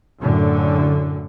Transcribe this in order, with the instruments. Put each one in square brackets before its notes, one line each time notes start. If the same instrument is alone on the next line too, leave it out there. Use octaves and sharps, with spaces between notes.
[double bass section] F#2 A2 D3